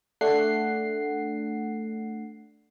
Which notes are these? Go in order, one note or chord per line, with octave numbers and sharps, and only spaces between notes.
A3 D4 F#5 C7